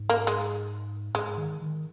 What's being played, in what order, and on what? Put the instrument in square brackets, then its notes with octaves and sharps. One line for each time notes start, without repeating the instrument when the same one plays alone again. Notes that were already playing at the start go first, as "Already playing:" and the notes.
Already playing: [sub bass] G#2
[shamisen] A#3
G#3
[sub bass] G#2 [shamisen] G#3
[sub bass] D#3
D#3